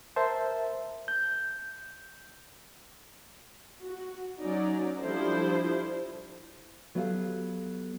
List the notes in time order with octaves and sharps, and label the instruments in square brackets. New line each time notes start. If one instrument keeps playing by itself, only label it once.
[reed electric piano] A#4 C5 E5 A5
G6
[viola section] F#4
F#3 C#4 D#4 D5 A#5
F3 G3 D4 E4 A4 C5
[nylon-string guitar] F#3 B3 G4 A4 F5